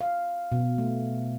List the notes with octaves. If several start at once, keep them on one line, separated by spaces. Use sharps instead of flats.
F5
B2
A3